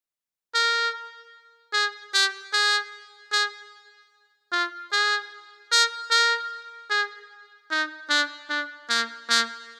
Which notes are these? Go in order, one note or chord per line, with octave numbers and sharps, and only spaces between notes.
A#4
G#4
G4
G#4
G#4
F4
G#4
A#4
A#4
G#4
D#4
D4
D4
A#3
A#3